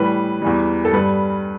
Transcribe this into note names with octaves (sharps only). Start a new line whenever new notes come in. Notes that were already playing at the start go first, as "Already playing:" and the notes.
Already playing: A2 E3 G3 B4
E2 E3 G3
A4
G2 G3 B4